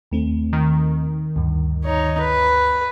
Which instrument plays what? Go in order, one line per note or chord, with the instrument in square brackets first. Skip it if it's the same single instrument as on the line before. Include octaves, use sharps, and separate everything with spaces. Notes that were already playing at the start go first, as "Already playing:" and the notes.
[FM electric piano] D#2 A3 C4
[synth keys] D#3
[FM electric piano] D2 G2
[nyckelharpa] D#4 C#5
B4